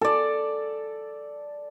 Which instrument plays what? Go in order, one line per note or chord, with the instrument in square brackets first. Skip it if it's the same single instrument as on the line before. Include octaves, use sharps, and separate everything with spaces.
[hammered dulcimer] A4 D5